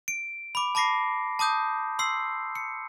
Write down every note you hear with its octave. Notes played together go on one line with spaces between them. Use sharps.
D7
B5 D6
A5 B5 D6 A#6 C7
A5 D6 D#6 G6
C6 E6 C7
C#7